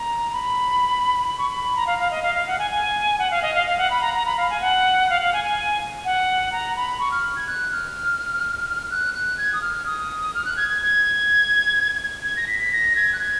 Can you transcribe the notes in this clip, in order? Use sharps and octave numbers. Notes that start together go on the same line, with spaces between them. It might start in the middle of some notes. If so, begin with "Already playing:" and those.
Already playing: A#5
B5
B5
C#6
B5
A#5
F5
F5
D#5
F5
F5
F#5
G#5
G#5
F#5
F5
D#5
F5
F5
F#5
B5
A#5
A#5
B5
F5
G#5
F#5
F5
F5
G#5
G#5
F#5
A#5
B5
C#6
F6
G#6
F#6
F6
F#6
F#6
G#6
D#6
F6
D#6
F6
F#6
G#6
G#6
G#6
G#6
A#6
B6
B6
A#6
G#6
F#6
G#6